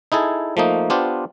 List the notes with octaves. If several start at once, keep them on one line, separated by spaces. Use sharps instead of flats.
D#4 E4 G#4 A4
F3 A3 A#3 D#4
B3 D4 F4 G4 C5